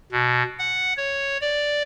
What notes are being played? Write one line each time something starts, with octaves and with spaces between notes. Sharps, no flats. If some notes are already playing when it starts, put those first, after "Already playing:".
B2
F#5
C#5
D5